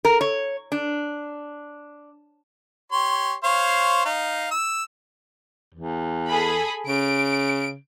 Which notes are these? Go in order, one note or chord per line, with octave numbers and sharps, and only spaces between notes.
A#4
C#5
D4
G4 C#5 C6
C5 C#5 F5
D#4 F5
E6
E2
G#4 A4 B5
C#3 D7